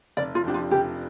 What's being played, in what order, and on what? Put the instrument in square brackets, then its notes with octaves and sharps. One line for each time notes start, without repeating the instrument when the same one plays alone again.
[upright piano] F1 [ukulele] D5
[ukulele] F4
[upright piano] F2 F3 D4 G4
[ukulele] F4
[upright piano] F1 [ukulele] G4